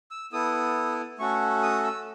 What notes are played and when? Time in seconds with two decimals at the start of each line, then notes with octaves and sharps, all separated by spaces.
0.11 E6
0.33 B3 E4 A4 D#6
1.19 A3 C#4 F#4 A4 C#6
1.63 D#6
1.84 E6